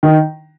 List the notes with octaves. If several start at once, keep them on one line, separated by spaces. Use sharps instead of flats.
D#3